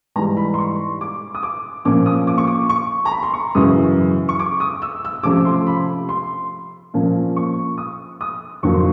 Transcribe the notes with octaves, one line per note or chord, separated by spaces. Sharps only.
G#2 E3 G3 A#5
B5
C6
C#6
D6
D#6
D6
A#2 F3 A#3 C#4 D6
D#6
D6
C#6
D6
C#6
A#5
B5
C6
C#6
F#2 C#3 E3 D#6
C#6
D6
D#6
E6
E6
C3 F3 A3 C#4 D6
C6
B5
C6
A#2 F3 A#3 C#4
C#6
D#6
D#6
F2 D3 F#3 A#3 C#6
C6